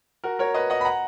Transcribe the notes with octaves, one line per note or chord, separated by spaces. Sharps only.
F#4 A#4
A#4 C#5
B4 D#5
D#5 F#5
B5
F#5 A#5